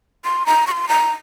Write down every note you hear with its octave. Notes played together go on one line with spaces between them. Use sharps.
C6
A#5
C#6
C6
A#5